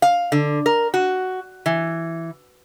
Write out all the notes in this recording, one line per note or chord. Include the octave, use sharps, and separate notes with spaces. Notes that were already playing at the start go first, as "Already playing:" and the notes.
F5
D3
A#4
F#4
E3